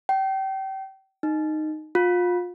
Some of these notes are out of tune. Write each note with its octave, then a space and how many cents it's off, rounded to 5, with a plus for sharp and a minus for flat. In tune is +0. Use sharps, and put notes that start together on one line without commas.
G5 -30
D#4 -10
F4 +30